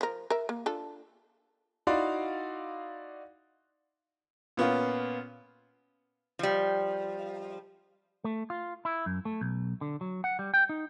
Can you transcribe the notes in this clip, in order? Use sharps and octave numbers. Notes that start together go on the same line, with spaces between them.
F3 A#4
A#4 E5
A#3
D4 F4 A4
D#4 E4 F#4 D5 F5 C6
A#2 B3 C#4 F4
F3 G3
A3
F4
E4
F#2
A3
B1
D3
F#3
F#5
G3
G5
D#4